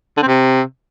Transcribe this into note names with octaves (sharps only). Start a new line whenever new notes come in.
D3
C4
C3